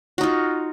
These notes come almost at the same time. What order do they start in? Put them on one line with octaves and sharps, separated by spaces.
F#4 D#4 F4